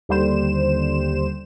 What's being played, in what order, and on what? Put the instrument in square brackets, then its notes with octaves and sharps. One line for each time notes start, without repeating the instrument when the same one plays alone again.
[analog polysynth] D#2 D3 G3 C5 E7